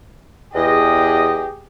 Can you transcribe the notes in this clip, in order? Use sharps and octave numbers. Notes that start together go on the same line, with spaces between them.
E2 G4 G#4 D#5